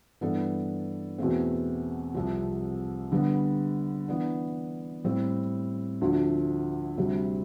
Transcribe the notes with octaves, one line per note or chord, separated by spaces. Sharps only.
G2 E3 B3 D4 A4
E2 B2 A3 C4
C2 C3 F3
D3 G3 B3
E3 B3 D4
A2 G3 C4
D2 D3 F3 A3
D2 C3 G3